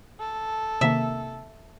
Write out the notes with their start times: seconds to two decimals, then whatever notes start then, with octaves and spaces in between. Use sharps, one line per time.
0.20 A4
0.81 C3 D#3 A#3 E5